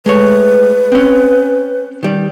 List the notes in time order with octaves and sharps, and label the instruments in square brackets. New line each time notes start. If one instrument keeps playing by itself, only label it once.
[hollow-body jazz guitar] G#3 A3 C#5 [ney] B4
[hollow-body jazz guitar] C4 C#4
D#3 G3